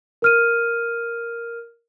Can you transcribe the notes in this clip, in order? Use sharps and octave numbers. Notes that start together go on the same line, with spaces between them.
A#4 F6 D#7